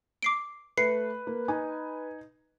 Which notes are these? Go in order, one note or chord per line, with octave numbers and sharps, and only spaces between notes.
D6 C7 D7
A3 B4 C7 C#7
A#3
D#4 G#5